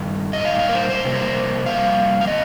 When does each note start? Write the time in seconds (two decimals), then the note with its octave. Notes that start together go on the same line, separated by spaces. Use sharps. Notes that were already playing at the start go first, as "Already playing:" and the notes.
Already playing: G2 D#3
0.33 D#5
0.44 A#2 G3 D#4 F5
0.59 F5
0.69 A#4
0.74 C5
0.90 C5
1.05 F2 C3 G3 A#3
1.15 C5
1.66 F2 C3 D#3 G3 A#3 F5
2.21 F5
2.27 D#3 C4 D#5